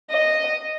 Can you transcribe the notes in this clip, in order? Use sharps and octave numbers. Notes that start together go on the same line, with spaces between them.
D#5